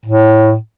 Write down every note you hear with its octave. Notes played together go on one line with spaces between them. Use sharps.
A2